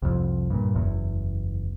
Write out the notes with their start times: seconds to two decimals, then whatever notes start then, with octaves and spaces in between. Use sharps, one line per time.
0.02 C2 F2
0.50 G2 A#2
0.75 F#1 E2